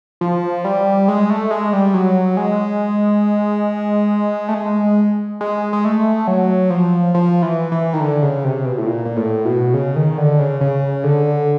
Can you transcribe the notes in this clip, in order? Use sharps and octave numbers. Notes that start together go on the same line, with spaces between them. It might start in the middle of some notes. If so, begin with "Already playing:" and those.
F3
G3
G#3
A3
G#3
G3
F#3
G#3
A3
G#3
G#3
G#3
A3
F#3
F3
F3
E3
E3
D#3
D3
C#3
C3
B2
A2
A#2
A#2
A2
B2
C#3
D#3
D3
C#3
C#3
D3